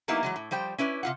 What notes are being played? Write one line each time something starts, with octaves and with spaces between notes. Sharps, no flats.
F#3 A#3 B3 D#4 E4 G4
E3 F#3 G#3
A2
F3 G3 C5 G5
C#4 E4 B4 D5
C3 F4 F#5